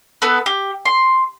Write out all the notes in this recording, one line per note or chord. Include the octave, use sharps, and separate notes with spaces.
B3 A4 B4
G4
C6